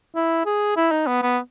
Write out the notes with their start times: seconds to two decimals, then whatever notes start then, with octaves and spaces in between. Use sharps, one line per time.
0.15 E4
0.46 G#4
0.77 E4
0.92 D#4
1.07 B3
1.22 B3